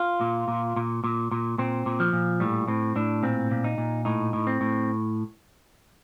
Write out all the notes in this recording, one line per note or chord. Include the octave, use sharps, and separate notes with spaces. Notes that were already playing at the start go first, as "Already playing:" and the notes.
Already playing: F4
A#2
A#2
A#2
A#2
A#2
A#2 C4
A#2
F3
A#2
A2 G3
A2 C4
A2 D4
A#2 C4
A#2
D#4
A#2
A2 D#4
A2
C4
A2